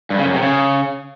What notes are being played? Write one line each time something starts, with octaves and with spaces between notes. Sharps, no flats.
G2
C#3
F#2
C3
C#3